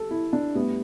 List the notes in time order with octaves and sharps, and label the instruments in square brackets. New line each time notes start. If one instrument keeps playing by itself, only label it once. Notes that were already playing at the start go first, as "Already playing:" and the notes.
Already playing: [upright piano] G3 A4
E4
D4
A2 G3 B3